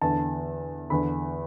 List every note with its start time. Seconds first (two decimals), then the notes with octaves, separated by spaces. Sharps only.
0.02 E2 D3 A5
0.90 E2 D3 B5